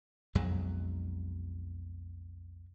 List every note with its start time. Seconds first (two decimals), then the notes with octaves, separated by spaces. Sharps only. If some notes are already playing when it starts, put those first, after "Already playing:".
0.35 B1 F2 F#3 G#3